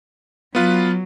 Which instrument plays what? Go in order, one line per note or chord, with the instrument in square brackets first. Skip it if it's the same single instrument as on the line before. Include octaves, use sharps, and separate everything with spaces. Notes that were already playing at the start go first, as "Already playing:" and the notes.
[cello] F#3 [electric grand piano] B3 F4 B4